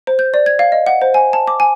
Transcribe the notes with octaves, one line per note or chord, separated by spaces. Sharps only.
C5
G6
D5
G#6
F5
D#5
F#5
C5
G#5
A5
D6
G#5